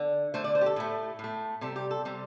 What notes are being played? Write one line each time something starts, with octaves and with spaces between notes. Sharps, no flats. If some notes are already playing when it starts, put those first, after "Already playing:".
Already playing: D3
D3 A3 C5
D5
C5
G4
A4
A2 A3
A2 A3
C3 G3 A4
G4
A4
C3 G3